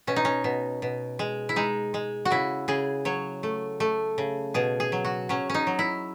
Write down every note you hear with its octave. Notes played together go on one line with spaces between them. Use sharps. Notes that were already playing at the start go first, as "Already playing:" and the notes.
B2 C#4
D#4
C#4
B2
B2
G#3
E4
G#3 D#4
G#3
F#4
C#3 E4
C#3 G#4
F#3 C#5
A3
A3
C#3
B2 G#4
G#4
F#3
F#4
F#3 C#4
C#4 D#4
F#3
E4